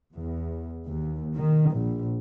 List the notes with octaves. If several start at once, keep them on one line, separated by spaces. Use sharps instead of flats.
E2
D#2
D#3
A#1